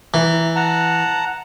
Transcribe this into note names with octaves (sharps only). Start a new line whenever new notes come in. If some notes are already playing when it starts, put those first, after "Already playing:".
E3 A#5
F#5 A5 A#5